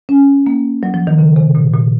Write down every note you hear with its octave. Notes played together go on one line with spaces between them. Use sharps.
C#4
A#3
F#3
F3
D#3
C#3
C3
A#2
A#2